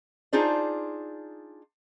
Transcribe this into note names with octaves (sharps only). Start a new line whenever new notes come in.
D4 D#4 F4 G#4 C5 D5